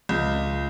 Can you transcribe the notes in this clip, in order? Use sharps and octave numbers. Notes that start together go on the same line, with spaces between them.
C#2